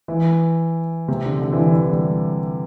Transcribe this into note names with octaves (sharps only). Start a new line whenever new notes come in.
E3
C3
D3
D3
E3
D3
E3
G3